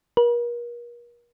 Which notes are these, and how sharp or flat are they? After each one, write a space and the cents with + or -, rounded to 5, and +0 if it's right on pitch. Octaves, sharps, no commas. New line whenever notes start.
A#4 +40